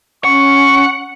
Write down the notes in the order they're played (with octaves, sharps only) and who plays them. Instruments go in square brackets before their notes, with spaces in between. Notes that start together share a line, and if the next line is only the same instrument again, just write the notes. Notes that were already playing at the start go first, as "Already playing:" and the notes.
[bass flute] C#4 [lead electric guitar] F#5 [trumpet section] C#6